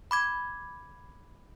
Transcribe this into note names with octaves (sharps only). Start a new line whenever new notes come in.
B5 D6 G#6